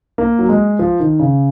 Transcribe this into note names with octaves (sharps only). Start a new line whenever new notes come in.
A#3
F#3
G#3
F3
D#3
C#3